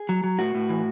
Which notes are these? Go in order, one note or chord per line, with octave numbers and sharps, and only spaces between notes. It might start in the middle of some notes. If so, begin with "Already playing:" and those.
Already playing: G#4
F#3
F#3
A2 F#4
A2
E3